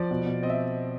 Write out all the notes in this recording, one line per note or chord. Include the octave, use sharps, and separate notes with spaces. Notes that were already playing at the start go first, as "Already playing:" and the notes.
Already playing: F3 D5
B2
B2
C4 D#5
E5